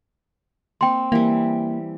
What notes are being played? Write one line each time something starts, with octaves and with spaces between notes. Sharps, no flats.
A#3 C4 G5 C6
E3 G3 A#3